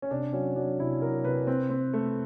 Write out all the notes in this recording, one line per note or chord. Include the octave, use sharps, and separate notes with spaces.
C#4
C3 D4
F#3 C#4
F#3 D4
C3 E4
F#3 A#4
C3 B4
C4
C4
A3